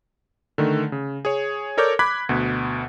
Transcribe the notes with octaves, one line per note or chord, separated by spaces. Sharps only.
D3 D#3 A3
C#3
G#4 C#5
A4 A#4 C#5 D5 D6 G6
B5 D6 F#6 G#6 B6
D2 B2